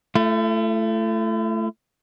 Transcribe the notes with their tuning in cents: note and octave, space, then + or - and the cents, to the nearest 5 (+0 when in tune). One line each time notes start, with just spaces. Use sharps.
A3 +0 E4 +45